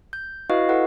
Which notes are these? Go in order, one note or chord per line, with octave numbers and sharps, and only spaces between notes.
G6
E4 F#4 B4 D#5 F5
E4 A4 B4 F#5